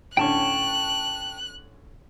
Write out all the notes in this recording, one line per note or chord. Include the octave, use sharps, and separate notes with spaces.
A2 D3 C#4 G5 A5 C#6 F#6